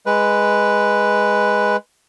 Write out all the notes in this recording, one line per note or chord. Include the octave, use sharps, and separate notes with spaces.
G#3 B4